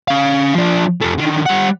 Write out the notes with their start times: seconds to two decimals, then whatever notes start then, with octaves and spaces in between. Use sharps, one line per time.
0.08 C#4 F5
0.55 F3 D4
1.02 F2 A3
1.18 D3 D#3
1.46 G3 F#5